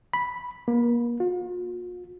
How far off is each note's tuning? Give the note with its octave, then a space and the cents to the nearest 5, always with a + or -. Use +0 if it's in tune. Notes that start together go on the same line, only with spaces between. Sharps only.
B5 -5
A#3 +35
F4 +45